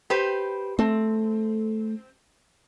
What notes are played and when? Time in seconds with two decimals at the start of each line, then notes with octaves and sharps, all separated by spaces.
0.10 G4 B4 C5
0.79 A3 C4